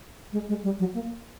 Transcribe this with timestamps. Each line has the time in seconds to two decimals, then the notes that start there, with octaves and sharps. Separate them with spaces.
0.33 G#3
0.49 G#3
0.63 G3
0.79 F#3
0.94 A#3